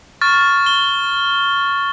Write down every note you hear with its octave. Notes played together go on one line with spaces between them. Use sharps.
C#6 F6 A6
G7